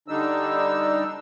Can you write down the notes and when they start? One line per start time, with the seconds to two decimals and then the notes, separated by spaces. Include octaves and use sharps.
0.08 D3 G3 D4 D#4 E6